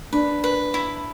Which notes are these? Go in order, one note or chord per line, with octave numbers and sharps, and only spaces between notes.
D4 B4
B4
E4